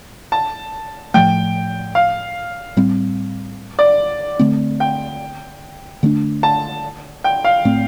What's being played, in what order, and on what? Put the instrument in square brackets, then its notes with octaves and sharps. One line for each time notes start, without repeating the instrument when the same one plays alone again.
[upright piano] A5
[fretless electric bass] A2 F3 A3 [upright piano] G5
[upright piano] F5
[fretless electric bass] A2 G3 C4
[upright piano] D5
[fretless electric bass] D3 A3 C4
[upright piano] G5
[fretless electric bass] D3 A3 D4
[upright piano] A5
G5
F5
[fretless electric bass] A2 A3 C4